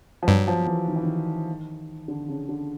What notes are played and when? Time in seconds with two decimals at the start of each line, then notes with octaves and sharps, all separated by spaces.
0.23 F3
0.28 G2 F#3
0.48 F3
0.67 E3
0.88 D#3
0.96 E3
1.03 D#3
2.08 D3
2.28 C#3
2.49 D3